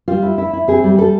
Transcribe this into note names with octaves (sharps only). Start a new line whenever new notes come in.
G3 F4
E4
E4
E4
C4 G#4
G3
G3 A4